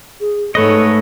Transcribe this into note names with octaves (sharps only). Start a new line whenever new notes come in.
G#4
G#2 A3 A4 B4 C#5 D#5